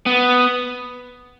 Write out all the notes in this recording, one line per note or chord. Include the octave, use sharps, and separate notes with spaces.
B3